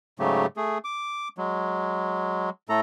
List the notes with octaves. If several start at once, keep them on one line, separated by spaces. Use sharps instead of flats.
G#2 C#3 F#3 A3 G4
A3 G#4
D6
F#3 G#3
A2 A3 A4 A#5